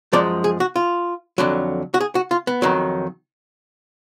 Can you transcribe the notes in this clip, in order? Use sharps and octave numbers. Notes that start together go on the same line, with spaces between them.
F#2 F3 G#3 D5
G#4
F#4
F4
F2 D3 F#3
F#4
G#4
F#4
F4
B3
F2 D#3 F#3